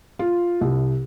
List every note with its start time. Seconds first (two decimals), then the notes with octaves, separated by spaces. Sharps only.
0.19 F4
0.61 C2